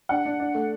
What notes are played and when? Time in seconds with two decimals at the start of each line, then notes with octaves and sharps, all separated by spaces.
0.09 D4 F#5
0.26 D4
0.40 D4
0.54 A3